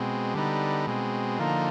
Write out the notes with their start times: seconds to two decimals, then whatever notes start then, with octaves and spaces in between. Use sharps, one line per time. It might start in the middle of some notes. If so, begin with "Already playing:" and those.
Already playing: B2 G#3 C4
0.34 D3 G3 B3 D#4
0.87 B2 G#3 C4
1.39 D3 F3 A#3 D#4